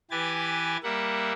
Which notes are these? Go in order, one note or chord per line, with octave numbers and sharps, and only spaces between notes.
E3 G4 B4 G#5 A6
G3 A#3 E5 F#5